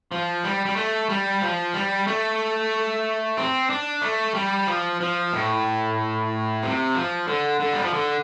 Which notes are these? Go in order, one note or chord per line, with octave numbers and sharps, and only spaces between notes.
F3
G3
G3
A3
G3
F3
G3
A3
C4
D4
A3
G3
F3
F3
A2
C3
F3
D3
D3
G3
F3
D3